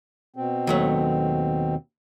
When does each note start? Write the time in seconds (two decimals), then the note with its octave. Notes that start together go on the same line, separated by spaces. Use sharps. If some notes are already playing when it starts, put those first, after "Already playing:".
0.36 B2 C4
0.67 D#2 F#3 A3